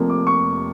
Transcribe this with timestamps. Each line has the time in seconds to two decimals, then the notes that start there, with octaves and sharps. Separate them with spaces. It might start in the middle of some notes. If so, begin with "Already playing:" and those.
Already playing: F1 F2 C3 F3 A#3
0.10 D6
0.27 C#6